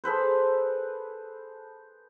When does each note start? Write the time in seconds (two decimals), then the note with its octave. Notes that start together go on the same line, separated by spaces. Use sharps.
0.04 G#4 A4 B4 C5